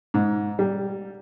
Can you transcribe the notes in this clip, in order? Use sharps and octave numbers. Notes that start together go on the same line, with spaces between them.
G#2
G3